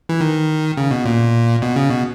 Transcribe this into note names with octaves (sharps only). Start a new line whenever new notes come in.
E3
D#3
C#3
B2
A#2
B2
C#3
B2